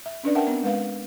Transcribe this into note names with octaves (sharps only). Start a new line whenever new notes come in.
E5
C#4 D4 B4 D5
A#4 E5 F#5 G5 A5
B3 C4
G#3 B4 F5